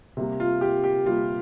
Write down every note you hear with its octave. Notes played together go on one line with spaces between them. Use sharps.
C3 G3 A#3
F4
G4
G4
C3 G3 A#3 F4